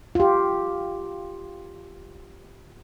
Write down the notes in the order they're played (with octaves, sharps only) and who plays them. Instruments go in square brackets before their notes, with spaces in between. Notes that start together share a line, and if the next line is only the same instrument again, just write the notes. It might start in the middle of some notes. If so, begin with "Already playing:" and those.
[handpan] F4 G4